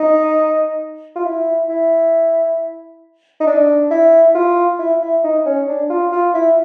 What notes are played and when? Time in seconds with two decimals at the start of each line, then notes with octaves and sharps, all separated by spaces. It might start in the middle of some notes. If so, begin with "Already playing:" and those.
Already playing: D#4
1.16 F4
1.25 E4
1.69 E4
3.40 D#4
3.47 D4
3.90 E4
4.35 F4
4.79 E4
5.01 E4
5.24 D#4
5.45 C#4
5.68 D4
5.90 F4
6.12 F4
6.34 E4